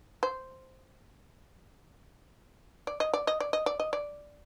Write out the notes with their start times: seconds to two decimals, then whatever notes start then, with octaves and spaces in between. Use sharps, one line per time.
0.23 C5
2.87 D5
3.00 D#5
3.14 D5
3.27 D#5
3.40 D5
3.53 D#5
3.66 D5
3.80 D#5
3.93 D5